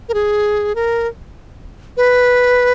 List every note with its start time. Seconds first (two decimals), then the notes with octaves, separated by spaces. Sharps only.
0.09 A#4
0.14 G#4
0.75 A#4
1.97 B4